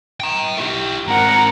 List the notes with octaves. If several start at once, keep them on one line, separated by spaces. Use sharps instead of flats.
G5 A#5
E4 G4
G#2 C4 A#4 F#5